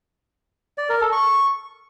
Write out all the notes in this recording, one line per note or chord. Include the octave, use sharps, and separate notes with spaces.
D5
A#4
A4
C#6